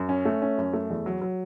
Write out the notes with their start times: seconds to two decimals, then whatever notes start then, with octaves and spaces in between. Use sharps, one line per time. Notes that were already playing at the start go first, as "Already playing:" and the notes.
Already playing: F#2
0.09 C#4
0.25 A3
0.42 C#4
0.58 F#2
0.73 A3
0.90 E2
1.06 F#3
1.22 F#3